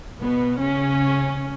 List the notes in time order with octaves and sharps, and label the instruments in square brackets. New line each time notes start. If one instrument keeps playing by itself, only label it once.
[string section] B2 B3
C#3 C#4